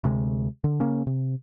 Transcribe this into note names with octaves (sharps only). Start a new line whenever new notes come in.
D2 C3 G#3
D3
C#3 A#3 C#4
C3